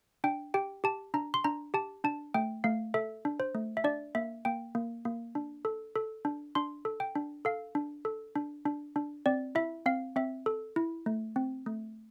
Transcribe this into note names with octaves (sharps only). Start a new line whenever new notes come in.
D4 G5
G4 G5
G4 A5
D4 A#5
C6
D4 A#5
G4 A5
D4 A5
A3 G5
A3 F5
A4 E5
D4
C5
A3
E5
D4 D5
A#3 E5
A#3 G5
A#3
A#3
D4
A4
A4
D4
D4 C6
A4
G5
D4
A4 F5
D4
A4
D4
D4
D4
C4 D5
E4 E5
C4 F5
C4 E5
A4
E4
A3
C4
A3